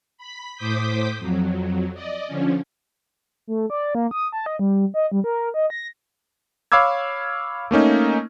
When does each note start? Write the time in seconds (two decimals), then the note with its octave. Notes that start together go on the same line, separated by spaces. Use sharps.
0.18 B5 B6
0.55 A2 C5 D6 D#6 G6 B6
1.19 F2 F#3
1.94 D5 D#5
2.27 D3 F3 C#4
3.47 A3
3.70 D5
3.95 A#3
4.11 D#6
4.32 A5
4.46 D#5
4.59 G3
4.94 D#5
5.12 G3
5.24 A#4
5.54 D#5
5.70 A#6
6.72 C#5 F5 B5 D6 E6 G#6
7.71 A3 A#3 C#4 D#4